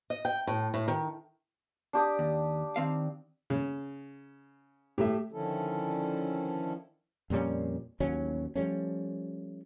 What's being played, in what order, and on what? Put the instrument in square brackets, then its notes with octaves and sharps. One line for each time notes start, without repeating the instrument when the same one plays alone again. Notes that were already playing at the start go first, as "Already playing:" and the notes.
[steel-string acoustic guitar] D#5
G5
A2
A2
D#3
[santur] D4 G4 D#6
[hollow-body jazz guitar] D#2
D#3 C4 F5
[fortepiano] C#3
[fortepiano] A2 E5 [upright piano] A3 G4
[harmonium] D3 D#3 F3 C#4 E4 A4
[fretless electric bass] F2 A#2 G3 C#4
A1 D#2 F#3 C#4
F3 G3 A3 C#4